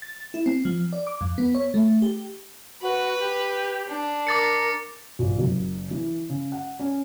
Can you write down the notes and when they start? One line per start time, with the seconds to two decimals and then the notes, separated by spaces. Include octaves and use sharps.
0.02 A6
0.34 E4
0.46 C4
0.65 F3
0.93 D5
1.07 D6
1.21 F2
1.38 B3
1.55 C#5
1.74 A3
2.02 G4
2.82 F#4 B4
3.19 G4
3.88 D4
4.27 A#4 D6 A6 C#7
5.19 A#1
5.39 F#1
5.91 E3
6.30 C#3
6.52 F#5
6.79 C#4